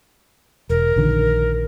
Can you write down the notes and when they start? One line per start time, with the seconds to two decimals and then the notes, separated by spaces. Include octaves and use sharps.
0.70 E1 A#4
0.96 A#1 D3 D#3